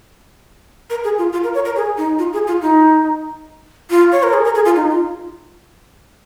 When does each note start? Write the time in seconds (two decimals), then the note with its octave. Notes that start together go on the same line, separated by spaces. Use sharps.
0.90 A#4
1.04 G#4
1.18 F4
1.33 F4
1.44 A#4
1.54 C#5
1.65 A#4
1.76 G#4
1.98 D#4
2.18 F4
2.33 G#4
2.47 F4
2.62 D#4
3.90 F4
4.12 C#5
4.23 A#4
4.33 G#4
4.44 A#4
4.55 G#4
4.65 F4
4.76 D#4
4.90 F4